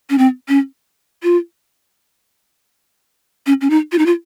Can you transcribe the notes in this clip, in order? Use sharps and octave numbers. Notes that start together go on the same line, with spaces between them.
C#4
C4
C#4
F4
C#4
C#4
D#4
F4
D#4
F4